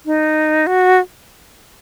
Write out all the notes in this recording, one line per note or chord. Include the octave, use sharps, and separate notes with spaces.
D#4
F#4